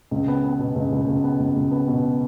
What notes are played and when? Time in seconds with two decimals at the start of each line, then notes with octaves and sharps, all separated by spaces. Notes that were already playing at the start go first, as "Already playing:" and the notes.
0.11 C#2
0.28 B3
0.44 B3
0.59 B2
0.75 C#2
0.92 C#2
1.08 C#2
1.24 B3
1.39 C#2
1.56 C#2
1.71 B3
1.88 B2